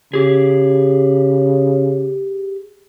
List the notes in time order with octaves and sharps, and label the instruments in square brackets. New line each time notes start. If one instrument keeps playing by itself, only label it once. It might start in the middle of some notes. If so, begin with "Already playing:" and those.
[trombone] C#3 [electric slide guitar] G4 G#4